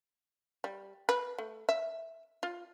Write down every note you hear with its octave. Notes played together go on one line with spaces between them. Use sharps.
G3
B4
A3
E5
F4